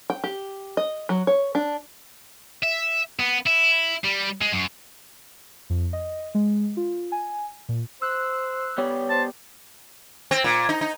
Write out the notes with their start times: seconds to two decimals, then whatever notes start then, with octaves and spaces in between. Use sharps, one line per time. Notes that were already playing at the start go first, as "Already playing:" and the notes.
0.10 G5
0.24 G4
0.77 D#5
1.09 F#3
1.27 C#5
1.55 D4
2.63 E5
3.20 B3
3.46 E4
4.04 G3
4.41 G#3
4.53 F#2
5.70 F2
5.93 D#5
6.35 G#3
6.77 F4
7.12 G#5
7.69 A#2
8.02 C5 E6 F#6
8.78 B3 G4 C#5 D5
9.10 C5 A5
10.31 C4
10.44 A#2
10.69 D#4
10.81 D#4